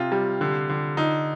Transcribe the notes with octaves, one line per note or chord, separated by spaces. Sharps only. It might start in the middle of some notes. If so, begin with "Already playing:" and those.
Already playing: C3 F4
G3
D3
D3
D3 D#4